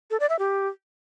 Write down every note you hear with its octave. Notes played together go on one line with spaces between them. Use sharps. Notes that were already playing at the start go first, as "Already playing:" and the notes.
A4
D5
E5
G4